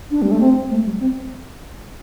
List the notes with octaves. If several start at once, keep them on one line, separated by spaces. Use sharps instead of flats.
D4
G3
A3
C4
A3
G3
C4